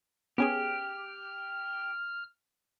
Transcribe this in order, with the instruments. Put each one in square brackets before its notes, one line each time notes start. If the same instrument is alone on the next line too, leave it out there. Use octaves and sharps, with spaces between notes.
[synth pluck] B3 C#4 G#4 [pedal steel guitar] G4 [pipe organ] F6